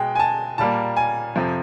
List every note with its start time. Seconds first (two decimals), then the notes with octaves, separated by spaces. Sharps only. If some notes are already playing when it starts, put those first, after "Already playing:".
Already playing: B2 G#3 G5
0.15 G#5
0.20 A5
0.58 A#2 G3 A#3 A5
0.97 G#5
1.36 F2 C3 F3